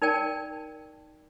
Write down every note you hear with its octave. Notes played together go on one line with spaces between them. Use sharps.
D#4 A#4 D5 G5 A5